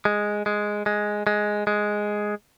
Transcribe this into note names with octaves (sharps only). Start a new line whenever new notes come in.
G#3
G#3
G#3
G#3
G#3